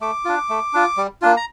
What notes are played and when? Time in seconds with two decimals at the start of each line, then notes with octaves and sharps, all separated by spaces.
0.01 A3 D6
0.25 D4 F4
0.49 A3
0.73 D4 F4
0.97 G3
1.22 A#3 D4 F4
1.37 A#5